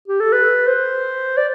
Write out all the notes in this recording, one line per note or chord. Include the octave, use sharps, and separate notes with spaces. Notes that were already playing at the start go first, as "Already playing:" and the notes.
G4
A4
B4
C5
D5